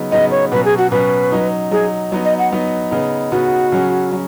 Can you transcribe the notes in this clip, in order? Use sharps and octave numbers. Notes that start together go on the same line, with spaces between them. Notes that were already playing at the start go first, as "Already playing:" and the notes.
Already playing: C#3 F#3 B3 D#4
C#3 F#3 B3 D#4 D#5
C#5
B2 F#3 C#4 B4
G#4
F#4
B2 F#3 C#4 B4
F#3 D#4
F#3 D#4 G#4
F#3 B3 D#4
D#5
F#5
F#3 B3 D#4
C#3 B3 D#4
C#3 B3 D#4 F#4
C#3 F#3 C#4
F#3 C#4